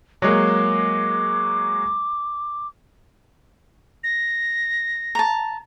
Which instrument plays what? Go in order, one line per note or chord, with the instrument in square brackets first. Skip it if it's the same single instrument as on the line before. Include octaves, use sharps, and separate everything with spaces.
[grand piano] F#3 G#3 A#3 [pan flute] D6
[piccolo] A#6
[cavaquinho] A5 A#5